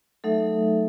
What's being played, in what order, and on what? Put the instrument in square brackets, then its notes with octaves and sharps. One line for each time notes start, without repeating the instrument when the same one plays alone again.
[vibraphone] F#3 A3 D#4 A4 E5